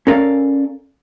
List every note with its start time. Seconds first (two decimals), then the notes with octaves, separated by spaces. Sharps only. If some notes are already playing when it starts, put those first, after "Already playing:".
0.07 C#4 A4 A#4 D5 F5